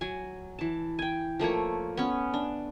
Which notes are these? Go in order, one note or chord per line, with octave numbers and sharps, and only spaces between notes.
F#3 G#5
E3 A5
G5 G#5
F3 A3 A#3 C#5
B3 C#4
D4